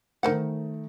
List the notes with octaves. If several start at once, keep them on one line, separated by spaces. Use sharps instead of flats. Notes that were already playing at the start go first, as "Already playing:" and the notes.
D#3 A3 A#4 C5 F#5